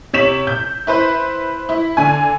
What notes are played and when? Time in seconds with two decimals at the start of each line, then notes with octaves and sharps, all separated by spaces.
0.13 C3 C#5 B6 E7 F#7
0.47 G6
0.87 E4 B4 C5
1.69 E4
1.97 D3 G#5